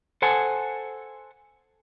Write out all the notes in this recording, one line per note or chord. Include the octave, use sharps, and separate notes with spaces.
A4 C5 F#5 G#5 A5